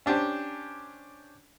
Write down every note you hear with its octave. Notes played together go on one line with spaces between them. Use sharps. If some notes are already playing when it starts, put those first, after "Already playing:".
C#4 D4 G4 C5